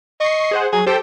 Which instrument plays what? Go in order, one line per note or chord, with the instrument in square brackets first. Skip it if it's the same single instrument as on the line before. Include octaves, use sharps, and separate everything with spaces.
[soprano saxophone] D#5 [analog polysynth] C#6 C7
[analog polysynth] G#4 C5 F#5
[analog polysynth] F#3 [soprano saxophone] G#4
[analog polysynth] G4 A4 G5 [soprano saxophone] C5